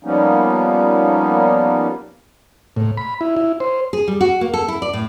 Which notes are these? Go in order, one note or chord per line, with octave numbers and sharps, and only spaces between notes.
F3 G3 A#3 B3 C#4 D#4
A2
B5
E4
E4
C5
G#4
G3
F#4
A#3
A4
E4
D5
A2